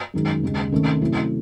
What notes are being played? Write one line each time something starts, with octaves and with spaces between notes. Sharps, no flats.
F#2 D#3 G#3 D#4
D#2 C#3 G#3
C3 D#3 A3 C#4
C3 F#3 A3 C#4 E4